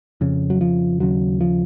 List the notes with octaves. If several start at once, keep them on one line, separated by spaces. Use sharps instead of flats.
F2 C#3
F#3
F3
D#2 C#3 F#3
F3